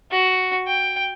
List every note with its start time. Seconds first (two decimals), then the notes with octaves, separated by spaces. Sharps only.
0.11 F#4
0.67 G5